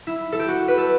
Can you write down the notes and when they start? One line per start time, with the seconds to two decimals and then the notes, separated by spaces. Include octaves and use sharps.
0.07 E4
0.32 A4
0.39 G4
0.48 F#4
0.68 B4
0.78 A4